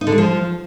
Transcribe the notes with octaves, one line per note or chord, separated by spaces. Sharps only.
D#4
D3
G#3
F3